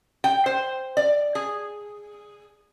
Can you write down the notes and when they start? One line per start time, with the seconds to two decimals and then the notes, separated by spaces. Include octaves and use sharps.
0.24 G5
0.46 C5
0.97 D5
1.35 G#4